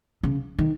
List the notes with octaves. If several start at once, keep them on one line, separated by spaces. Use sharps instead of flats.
C#3
D#3